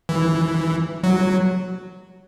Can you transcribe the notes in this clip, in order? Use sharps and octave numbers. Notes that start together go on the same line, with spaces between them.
E3
F#3